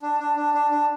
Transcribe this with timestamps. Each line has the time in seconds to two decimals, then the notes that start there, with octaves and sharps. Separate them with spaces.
0.02 D4
0.20 D4
0.36 D4
0.54 D4
0.71 D4